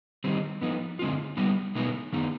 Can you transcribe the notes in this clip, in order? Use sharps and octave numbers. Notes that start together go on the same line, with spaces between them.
D#3 G3 C4 D#4
F3 B3 D#4
D3 G#3 C4 F4
G3 B3 D#4
B2 G#3 B3 D#4
D#3 B3 D#4